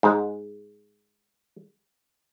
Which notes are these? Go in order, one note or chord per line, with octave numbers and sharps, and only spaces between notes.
G#2 G#3